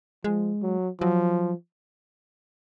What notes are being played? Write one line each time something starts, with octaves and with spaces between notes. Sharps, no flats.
F3 G#3
F#3
F3 F#3